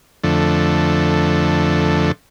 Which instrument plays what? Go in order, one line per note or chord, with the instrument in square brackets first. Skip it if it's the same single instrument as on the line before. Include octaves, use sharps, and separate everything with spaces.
[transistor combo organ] F2 D3 A3